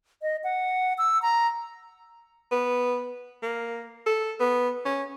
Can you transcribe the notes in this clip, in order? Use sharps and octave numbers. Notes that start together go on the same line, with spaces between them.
D#5
F#5
E6
A#5
B3
A#3
A4
B3
C#4